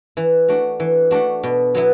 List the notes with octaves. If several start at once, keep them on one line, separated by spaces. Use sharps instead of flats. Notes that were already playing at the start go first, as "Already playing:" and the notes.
E3
A3 D4 F#4
E3
A3 D4 F#4
B2
F#3 B3 E4